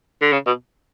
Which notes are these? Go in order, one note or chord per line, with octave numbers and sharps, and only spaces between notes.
D3
C#3
B2